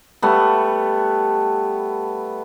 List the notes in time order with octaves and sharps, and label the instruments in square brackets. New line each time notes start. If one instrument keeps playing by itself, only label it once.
[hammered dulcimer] G3 A3 B3